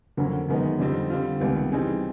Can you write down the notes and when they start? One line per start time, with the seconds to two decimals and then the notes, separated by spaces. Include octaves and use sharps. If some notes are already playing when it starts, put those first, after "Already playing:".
0.17 F2 D3 F#3 A#3 C#4
0.49 F#2 D#3 G#3 B3 D#4
0.79 F2 D3 G3 C4 D#4
1.10 D3 G3 C4 F4
1.40 C#2 C3 D#3 G3 B3
1.71 E3 G3 C4 D#4 G#4